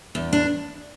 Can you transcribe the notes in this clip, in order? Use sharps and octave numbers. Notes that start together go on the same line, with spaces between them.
E2
D4